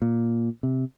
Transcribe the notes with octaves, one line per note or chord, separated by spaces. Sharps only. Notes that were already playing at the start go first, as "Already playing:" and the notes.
A#2
C3